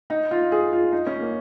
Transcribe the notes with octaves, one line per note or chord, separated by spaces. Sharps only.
D#4
F4
G#4
F4
D#4
C#4
A#3